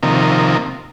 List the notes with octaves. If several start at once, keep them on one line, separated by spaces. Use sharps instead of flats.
C3 D#3 F3 A#3